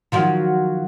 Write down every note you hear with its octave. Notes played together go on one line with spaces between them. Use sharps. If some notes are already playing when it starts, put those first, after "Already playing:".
D#3 F3 F#3